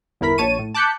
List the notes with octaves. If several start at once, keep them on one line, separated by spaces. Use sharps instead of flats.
G1 E2 E4 A#4 B5 B6
A#1 C#5 A5 C#6 D#7
A2
A5 D6 F#6 G6 B6 C#7